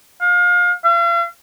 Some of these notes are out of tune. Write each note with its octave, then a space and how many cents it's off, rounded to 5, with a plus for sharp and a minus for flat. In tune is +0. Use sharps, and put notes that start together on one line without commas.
F5 +30
F5 -40